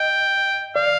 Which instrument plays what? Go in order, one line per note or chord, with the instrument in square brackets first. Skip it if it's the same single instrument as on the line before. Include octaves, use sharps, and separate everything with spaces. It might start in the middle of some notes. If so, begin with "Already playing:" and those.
Already playing: [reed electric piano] D#5 [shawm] G5
[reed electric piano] D5 [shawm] F5